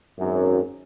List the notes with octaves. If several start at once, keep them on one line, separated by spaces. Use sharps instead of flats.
G#1 F#2